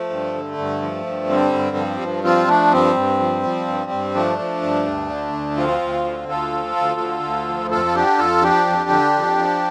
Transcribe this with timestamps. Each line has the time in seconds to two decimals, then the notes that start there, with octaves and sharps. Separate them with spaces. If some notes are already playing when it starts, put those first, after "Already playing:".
Already playing: F3 A3
0.10 G2
0.34 D3
0.58 G2
0.82 F3
1.06 G2
1.29 D3 G3 C4
1.53 G2
1.76 F3
2.01 G2
2.24 F3 C4 F4
2.48 F3 A3 D4
2.71 G2 G3 C4
2.96 G2
3.19 F3
3.43 F3
3.68 G2
3.91 G2
4.14 F3 A3 D4
4.39 F3
4.62 G2
4.86 D2
5.09 D3
5.33 D2
5.57 F3 C4 F4
5.81 D2
6.04 D3
6.28 D2 F4 A4
6.52 F3
6.76 D2
7.00 D3
7.23 D2
7.48 F3
7.71 F2 F4 A4
7.85 F4
7.95 D3 D4 G4
8.18 F2 F4 A4
8.42 F3 D4 G4
8.66 F2
8.90 D3
9.14 F2
9.37 F3